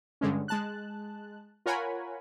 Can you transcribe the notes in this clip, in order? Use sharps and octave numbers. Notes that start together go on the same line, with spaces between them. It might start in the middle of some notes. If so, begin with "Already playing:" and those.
G2 D3 G#3 C#4
G#3 A5 F#6
F4 A#4 C#5 F#5 G#5 B5